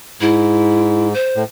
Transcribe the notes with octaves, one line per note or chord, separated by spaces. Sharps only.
G#2 E4
C5
A2